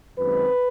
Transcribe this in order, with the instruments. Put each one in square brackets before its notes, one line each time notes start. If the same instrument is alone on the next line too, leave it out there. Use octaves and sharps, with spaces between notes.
[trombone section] F#2 D#3 G#3 C4 B4